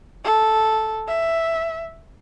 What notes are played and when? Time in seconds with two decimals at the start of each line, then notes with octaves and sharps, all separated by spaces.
0.24 A4
1.08 E5